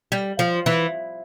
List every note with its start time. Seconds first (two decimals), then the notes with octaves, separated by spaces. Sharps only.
0.12 G3
0.39 F3
0.66 E3